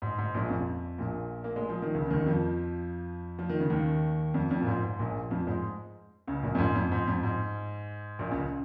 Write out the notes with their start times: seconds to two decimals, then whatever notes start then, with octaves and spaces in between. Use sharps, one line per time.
0.02 G#2
0.18 G#2
0.34 A#1 A#2
0.50 F2
0.98 A#1 A#2
1.44 A#3
1.56 G#3
1.69 F3
1.82 D#3
1.94 C#2 C#3
2.07 C#3
2.10 D#2 D#3
2.26 F2 F3
3.39 F3
3.49 D#3
3.60 C#3
3.70 D#2 D#3
4.34 F2
4.51 F2
4.61 A#2
4.67 G#2
4.83 G#2
4.99 A#1 A#2
5.31 F2 F3
5.47 G#2 G#3
6.27 C#2 C#3
6.43 A#1 A#2
6.55 F2
6.58 G#2
6.75 F2
6.92 G#2
7.07 F2
7.23 G#2
8.19 A#1 A#2
8.31 C#2 C#3